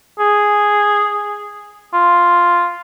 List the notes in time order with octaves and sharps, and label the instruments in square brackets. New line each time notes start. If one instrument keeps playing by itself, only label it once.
[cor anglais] G#4
F4